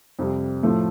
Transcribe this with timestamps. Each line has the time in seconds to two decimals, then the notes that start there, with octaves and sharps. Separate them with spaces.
0.19 F2 C3 G3
0.63 A2 F3 A3